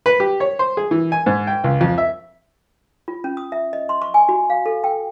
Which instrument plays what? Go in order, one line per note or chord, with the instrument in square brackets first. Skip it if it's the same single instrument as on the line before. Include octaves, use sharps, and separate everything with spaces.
[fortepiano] B4
G4
C#5
C5
G#4
E3
G#5
G#2
G5
C#2
F2
E5
[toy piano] F4
C#4
D#6
E5
D#5
C6
C#6
G#5
F#4
F5
A4
G5